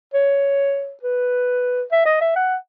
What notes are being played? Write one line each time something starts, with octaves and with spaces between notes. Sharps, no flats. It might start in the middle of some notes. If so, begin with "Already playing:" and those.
C#5
B4
E5
D#5
E5
F#5